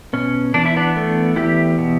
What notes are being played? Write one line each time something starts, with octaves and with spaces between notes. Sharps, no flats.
B2 C#4
E2 D4
E4
B3 D4
A3
E2 E4 G4
B2